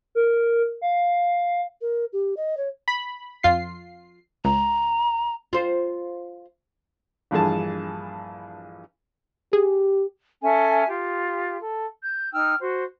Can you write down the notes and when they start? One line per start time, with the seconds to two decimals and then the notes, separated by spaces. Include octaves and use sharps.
0.15 A#4
0.81 F5
1.81 A#4
2.13 G4
2.37 D#5
2.57 C#5
2.88 B5
3.43 F2 F4 C7
4.45 C#2 A#5
5.53 F4 C5
7.31 A#1 G2 E3 G#4 A5
9.53 G4 G#4
10.42 C#4 A4 E5 G#5
10.87 F4 G4
11.60 A4
12.01 G6
12.32 D#4 G5 E6 F6
12.59 F#4 C5